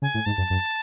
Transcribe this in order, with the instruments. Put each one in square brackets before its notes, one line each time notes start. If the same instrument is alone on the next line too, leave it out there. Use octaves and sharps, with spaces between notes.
[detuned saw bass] C#3 [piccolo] G#5
[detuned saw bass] A2
[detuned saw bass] G#2 [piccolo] A5
[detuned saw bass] F#2
F#2